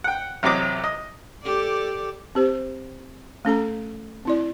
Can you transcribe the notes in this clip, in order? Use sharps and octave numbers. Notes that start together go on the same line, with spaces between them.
F#5 G5
A1 C3 F#3 C4 D#5 D6
D#5
G4 A4 D5
C4 G4 C5
A3 C#4 A4 A#5
C4 E4 D5